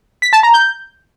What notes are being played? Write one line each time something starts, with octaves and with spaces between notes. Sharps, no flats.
B6
A5
A#5
G6